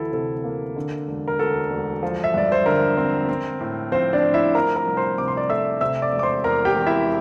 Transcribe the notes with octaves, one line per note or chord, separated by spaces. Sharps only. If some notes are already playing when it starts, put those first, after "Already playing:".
Already playing: D2 E3 E4 A4
C3 A4
A#3
D3
E1
A#4
D2 A4
E1
F3
E5
G2 D5
C5
D3 A#4
C4
C4
A2
F3 C4 C5
D4 D5
A2
E4 E5
F3 A#4 A#5
A#4 A#5
C2
C5 C6
C3 D6
C6
D5 D6
A3 E5 E6
C3 E5 E6
D5 D6
E1
D6
C5 C6
E2 A#4 A#5
G4 G5
E1
E4 E5